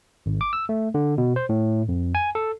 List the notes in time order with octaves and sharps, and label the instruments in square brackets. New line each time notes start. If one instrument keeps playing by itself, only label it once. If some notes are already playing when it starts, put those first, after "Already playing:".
[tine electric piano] G#1
D6
E6
A3
D3
B2
C5
A2
F2
G#5
A4